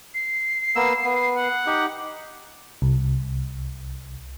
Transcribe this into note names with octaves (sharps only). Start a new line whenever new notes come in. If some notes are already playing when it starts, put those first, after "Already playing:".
C7
A#3 B3 E6
B3
F#5
D#4 G4
C2